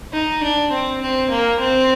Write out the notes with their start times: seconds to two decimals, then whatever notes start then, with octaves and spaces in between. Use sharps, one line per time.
0.13 D#4
0.43 D4
0.71 C4
1.01 C4
1.30 A#3
1.59 C4